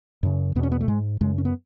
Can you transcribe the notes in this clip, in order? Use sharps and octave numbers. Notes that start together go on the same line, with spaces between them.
F#2 C#3
E2 B2 B3
C#4
B3
A3
G#2 G#3
F#2 C#3 G#3
C#4
B3